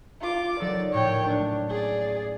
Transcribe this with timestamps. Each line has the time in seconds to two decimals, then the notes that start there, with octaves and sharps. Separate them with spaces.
0.21 F4 D6
0.60 F#3 D#4 A4 D5
0.93 A#1 A2 C#5 G5
1.27 A3 C#4 D4
1.70 G#4 D5